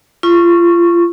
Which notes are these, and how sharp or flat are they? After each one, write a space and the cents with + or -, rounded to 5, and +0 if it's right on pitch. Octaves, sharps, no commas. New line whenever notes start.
F4 -30 C#6 -10